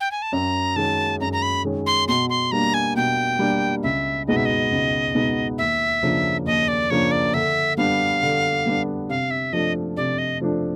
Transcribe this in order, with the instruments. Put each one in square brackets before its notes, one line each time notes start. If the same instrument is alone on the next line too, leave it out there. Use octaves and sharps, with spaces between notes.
[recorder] G5
G#5
A5
[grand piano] F#2 [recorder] A#5
[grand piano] D#3 G#3 C#4 [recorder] A5
[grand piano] F#2 [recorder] A#5
[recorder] A#5
B5
[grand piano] D#3 G#3 C#4
[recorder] C6
[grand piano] B2 [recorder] C6
[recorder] C6
[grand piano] G3 A#3 D4 [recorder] A#5
[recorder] G#5
[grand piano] B2 [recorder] G5
[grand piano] G3 A#3 D4
[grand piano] C#2 [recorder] E5
[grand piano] B2 G#3 B3 D#4 [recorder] D#5
[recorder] E5
D#5
[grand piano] C#2
B2 G#3 B3 D#4
[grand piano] D#2 [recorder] E5
[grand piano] C#3 F3 A#3 D4
[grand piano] D#2 [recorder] D#5
[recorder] D5
[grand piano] C#3 F3 A#3 D4 [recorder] C#5
[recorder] D5
[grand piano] D3 [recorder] E5
[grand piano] G3 B3 D4 [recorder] F5
[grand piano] D3
G3 B3 D4
[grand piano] C3 [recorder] F5
[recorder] E5
[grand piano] F3 A3 D4 [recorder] D#5
[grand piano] C3 [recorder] D5
[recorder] D#5
[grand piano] F3 A3 D4